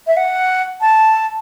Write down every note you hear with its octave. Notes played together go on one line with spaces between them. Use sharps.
E5
F#5
A5